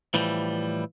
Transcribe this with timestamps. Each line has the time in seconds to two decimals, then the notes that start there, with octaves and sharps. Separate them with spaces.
0.14 A2 E3 F3 G3